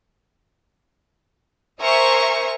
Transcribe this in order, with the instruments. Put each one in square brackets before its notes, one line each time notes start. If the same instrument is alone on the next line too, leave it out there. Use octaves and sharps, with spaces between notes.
[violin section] A#4 C5 E5 G#5 C#6